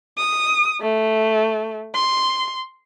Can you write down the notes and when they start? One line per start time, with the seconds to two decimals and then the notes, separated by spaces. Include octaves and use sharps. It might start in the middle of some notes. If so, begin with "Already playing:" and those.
0.18 D#6
0.81 A3
1.95 C6